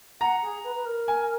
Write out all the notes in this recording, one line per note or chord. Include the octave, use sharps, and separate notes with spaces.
F#5 A#5
G#4
B4
B4
A#4
G#5